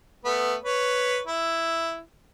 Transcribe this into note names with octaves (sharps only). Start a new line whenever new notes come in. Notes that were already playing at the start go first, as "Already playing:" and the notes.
A3 B3
B4 C#5
E4